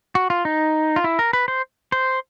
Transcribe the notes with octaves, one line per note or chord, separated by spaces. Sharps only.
F#4
F4
D#4
F4
E4
A#4
B4
C5
C5